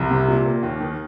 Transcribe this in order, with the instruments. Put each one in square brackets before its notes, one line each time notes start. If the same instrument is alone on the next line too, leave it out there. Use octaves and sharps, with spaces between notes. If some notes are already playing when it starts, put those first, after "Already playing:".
Already playing: [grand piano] C2
C3
A#2
A#3
D#2
D#3